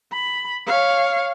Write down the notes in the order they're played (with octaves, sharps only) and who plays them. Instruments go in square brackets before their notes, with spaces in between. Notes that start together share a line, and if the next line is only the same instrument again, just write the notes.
[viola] B5
C#5 F5